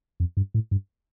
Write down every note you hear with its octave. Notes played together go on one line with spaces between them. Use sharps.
F2
G2
A2
G2